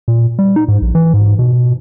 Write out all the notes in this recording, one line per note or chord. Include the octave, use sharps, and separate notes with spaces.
A#2
G3
D#4
G#2
A#1
E3
G#2
B2